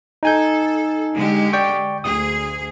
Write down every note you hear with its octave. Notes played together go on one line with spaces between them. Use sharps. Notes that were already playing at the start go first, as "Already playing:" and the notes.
D#4 A4 G#5 G6
D3 G#3 G4
D5 G5 C#6
D2 G#4 D#6